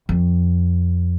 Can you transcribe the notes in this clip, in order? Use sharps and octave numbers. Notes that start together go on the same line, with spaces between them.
F2